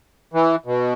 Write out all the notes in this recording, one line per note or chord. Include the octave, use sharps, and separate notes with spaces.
E3
B2